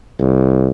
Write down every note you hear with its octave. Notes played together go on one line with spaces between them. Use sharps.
C2